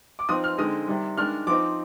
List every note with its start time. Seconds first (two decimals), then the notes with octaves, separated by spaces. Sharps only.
0.19 D6
0.29 F3 C4 D#4 D#6
0.44 F6
0.58 D3 G#3 C4 D#4 D#6
0.88 C3 D#3 G3
1.17 D#3 G#3 D4 F6
1.47 F3 C4 D#4 D6